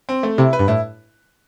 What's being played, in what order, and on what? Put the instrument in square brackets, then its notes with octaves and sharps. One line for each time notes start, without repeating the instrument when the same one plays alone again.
[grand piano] C4
A3
[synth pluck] C3 [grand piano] E4
[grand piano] B4
[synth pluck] G2
[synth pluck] A2 [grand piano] E4